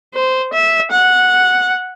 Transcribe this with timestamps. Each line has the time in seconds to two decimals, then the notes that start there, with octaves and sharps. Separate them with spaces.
0.14 C5
0.53 E5
0.91 F#5